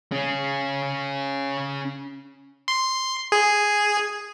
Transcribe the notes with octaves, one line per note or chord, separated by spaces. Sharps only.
C#4 G#4
C6
G#4